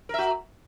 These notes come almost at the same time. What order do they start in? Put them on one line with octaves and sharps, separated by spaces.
A#4 E5 F#4